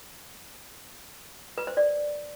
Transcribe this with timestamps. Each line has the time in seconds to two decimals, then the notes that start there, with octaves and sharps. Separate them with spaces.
1.58 B4
1.67 C5
1.77 D5